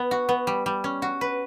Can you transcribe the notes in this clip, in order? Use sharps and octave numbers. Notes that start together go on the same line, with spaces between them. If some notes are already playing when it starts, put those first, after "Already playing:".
Already playing: B3
F#4
B3
G3
G3
C#4
F#4
B4